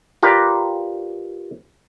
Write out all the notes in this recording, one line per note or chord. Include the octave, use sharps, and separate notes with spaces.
F4 G4 A#4 B4 D5